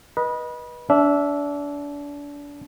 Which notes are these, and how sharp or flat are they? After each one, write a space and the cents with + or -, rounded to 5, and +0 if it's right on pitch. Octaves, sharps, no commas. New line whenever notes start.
B4 -25 D#5 -5
D4 -30 E5 +0